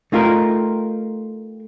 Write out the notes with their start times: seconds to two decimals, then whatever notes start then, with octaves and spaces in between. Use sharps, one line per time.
0.12 A3 D#4 F4 G4 A#4